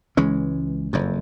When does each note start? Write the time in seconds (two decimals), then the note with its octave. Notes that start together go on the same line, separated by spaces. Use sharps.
0.17 C#2 E3 G#3 C#4
0.93 F#1 F2